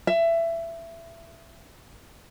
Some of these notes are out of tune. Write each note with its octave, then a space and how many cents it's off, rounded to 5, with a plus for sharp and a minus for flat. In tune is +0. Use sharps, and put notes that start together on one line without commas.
E5 +20